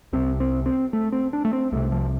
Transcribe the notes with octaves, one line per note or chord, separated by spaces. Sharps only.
C2 C3 C4
C4
C4
A3
C4
D4
A3
C4
C2 C3 A3
F3